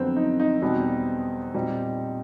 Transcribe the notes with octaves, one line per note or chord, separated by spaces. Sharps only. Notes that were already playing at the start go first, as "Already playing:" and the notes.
Already playing: F2 D3 F#3 B3 C4
D#4
D#4
E2 B2 G3 B3
A#2 G3 C4 D#4